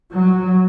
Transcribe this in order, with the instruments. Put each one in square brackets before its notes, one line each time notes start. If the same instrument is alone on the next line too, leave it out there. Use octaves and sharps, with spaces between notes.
[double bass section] F#3